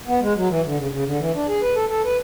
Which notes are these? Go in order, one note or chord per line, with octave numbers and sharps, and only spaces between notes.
B3
G#3
F#3
E3
D3
C#3
C#3
D3
E3
D4
G#4
B4
A4
A4
B4